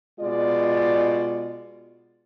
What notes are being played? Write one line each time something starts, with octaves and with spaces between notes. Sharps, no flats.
B2 G#3 F4 D5